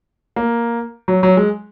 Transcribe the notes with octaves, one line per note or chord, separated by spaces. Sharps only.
A#3
F#3
F#3
G#3